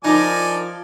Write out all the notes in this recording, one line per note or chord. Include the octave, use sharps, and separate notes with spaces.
F3 D#4 A#4 D5 G#5 D6